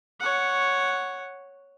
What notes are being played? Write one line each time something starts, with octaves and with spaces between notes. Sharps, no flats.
C#5 F#5